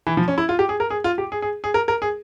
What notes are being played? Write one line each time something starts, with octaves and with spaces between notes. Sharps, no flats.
E3
F3
C#4
E4
F4
G4
G#4
A#4
G#4
F4
G4
G#4
G#4
G#4
A#4
A#4
G#4